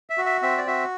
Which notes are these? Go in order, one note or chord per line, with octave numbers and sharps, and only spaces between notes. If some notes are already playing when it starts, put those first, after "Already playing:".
E5
F#4
E5
C4 E5
D5
F#4 E5